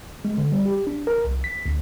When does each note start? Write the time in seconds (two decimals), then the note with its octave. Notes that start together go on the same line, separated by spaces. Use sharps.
0.25 G#3
0.38 D3
0.52 G3
0.66 G4
0.87 D4
1.07 A#4
1.24 C2
1.44 B6
1.66 D2